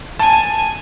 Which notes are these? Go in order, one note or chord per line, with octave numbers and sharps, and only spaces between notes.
G#5 A5